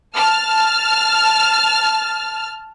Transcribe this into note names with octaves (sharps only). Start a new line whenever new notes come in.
A5 F6